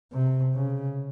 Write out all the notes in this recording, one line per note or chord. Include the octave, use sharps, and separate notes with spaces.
C3
C#3